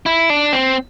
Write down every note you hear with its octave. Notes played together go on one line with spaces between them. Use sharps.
E4
D4
C4